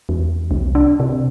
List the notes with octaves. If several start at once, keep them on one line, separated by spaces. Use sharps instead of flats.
E2
C2
D4
C3